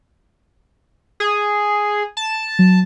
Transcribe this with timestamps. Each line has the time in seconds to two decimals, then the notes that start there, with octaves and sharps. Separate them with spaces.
1.20 G#4
2.17 A5
2.59 F#3